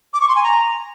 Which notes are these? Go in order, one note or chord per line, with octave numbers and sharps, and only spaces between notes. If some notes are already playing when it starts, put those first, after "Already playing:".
D6
C#6
C6
G#5
A#5